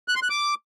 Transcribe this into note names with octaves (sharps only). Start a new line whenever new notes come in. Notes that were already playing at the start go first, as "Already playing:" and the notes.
F#6
C6
F#6
D6